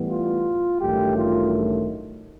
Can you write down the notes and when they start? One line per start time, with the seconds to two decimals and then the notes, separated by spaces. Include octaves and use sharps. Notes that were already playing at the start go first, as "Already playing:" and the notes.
Already playing: A2 E3 G3 B3
0.11 F4
0.80 A1 G2 D#3 F#3 A3 G4
1.16 F4